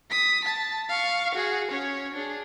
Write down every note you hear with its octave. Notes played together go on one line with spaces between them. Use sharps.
D#6 B6
A5
F5 C#6
F#4 G#4
C#4 C#5
D4 G#4